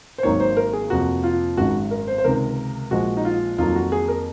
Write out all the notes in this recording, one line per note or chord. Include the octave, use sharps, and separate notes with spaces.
C5
G#1 G#2 D#3 F#3 A#3 C#5
C5
A#4
G#4
F2 C3 F3 A#3 F#4
F4
G#1 F#2 D#3 G#3 F#4
A#4
C5
C5
C#2 C3 D#3 G#3 A#4
A#1 A#2 F3 G#3 F#4
D#4
F4
F2 D#3 F#3 A#3 F4
F#4
G#4
A#4